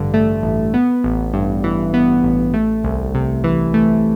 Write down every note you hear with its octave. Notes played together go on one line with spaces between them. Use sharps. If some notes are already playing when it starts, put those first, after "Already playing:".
Already playing: A1 G2 D3
A3
A1
B3
A1
G2
E3
B3
A1
A3
C2
C3
E3
A3